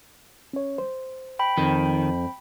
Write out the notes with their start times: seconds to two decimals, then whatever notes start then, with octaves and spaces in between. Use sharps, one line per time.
0.53 C#4 C#5
0.78 C5
1.39 G5 B5
1.58 F2 D#3